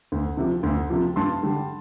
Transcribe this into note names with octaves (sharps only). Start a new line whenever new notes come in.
D2
C3 F3
D2
C3 F3
G2 A5 C6
D3 G3